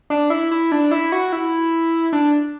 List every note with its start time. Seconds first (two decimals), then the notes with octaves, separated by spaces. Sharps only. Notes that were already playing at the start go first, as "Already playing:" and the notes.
0.10 D4
0.30 E4
0.51 E4
0.72 D4
0.91 E4
1.12 F#4
1.33 E4
2.13 D4